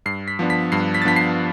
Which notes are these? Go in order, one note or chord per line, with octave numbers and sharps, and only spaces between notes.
G2 C7
B6
F3 B3 D4
B6
G2 C7
B6
A6
F3 B3 D4 B6
C7